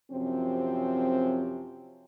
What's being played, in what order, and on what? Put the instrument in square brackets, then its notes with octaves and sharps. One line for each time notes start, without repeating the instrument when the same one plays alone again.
[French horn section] F#2 C3 F3 C4 C#4